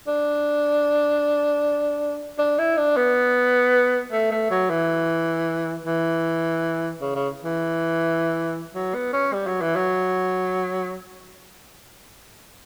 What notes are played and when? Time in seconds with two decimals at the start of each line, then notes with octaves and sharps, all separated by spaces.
0.07 D4
2.38 D4
2.58 E4
2.77 D4
2.97 B3
4.12 A3
4.31 A3
4.50 F#3
4.70 E3
5.86 E3
7.01 C#3
7.16 C#3
7.44 E3
8.75 F#3
8.94 B3
9.13 C#4
9.33 G3
9.47 F#3
9.61 E3
9.76 F#3